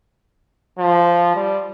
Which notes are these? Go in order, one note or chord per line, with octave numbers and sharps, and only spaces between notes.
F3
G3